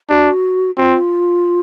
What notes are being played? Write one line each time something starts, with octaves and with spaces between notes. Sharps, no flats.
D4 F#4 G4
C4 F4 F#4